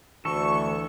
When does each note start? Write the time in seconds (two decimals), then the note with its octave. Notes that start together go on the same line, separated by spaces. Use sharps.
0.25 D2 E3 A4 C#6